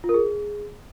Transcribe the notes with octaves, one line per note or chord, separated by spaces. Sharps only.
F4
A#4
G#4